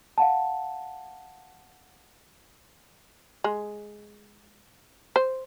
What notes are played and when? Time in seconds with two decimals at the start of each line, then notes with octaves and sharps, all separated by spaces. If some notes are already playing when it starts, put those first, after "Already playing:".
0.18 F5 F#5 A5
3.44 G#3
5.16 C5